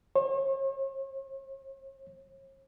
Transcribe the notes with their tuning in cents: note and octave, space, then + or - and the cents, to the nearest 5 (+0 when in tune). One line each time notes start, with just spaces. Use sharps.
C#5 -45